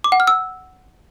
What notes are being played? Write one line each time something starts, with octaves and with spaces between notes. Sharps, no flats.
D6
F#5
F6
E6